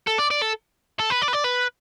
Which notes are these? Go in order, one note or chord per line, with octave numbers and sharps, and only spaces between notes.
A4
D5
D5
A4
A4
B4
D5
B4
D5
B4